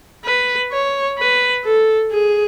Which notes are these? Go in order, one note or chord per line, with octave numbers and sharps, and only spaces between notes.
B4
C#5
B4
A4
G#4